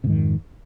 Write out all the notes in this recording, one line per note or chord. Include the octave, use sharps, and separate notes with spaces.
F2 G#2 C3 D#3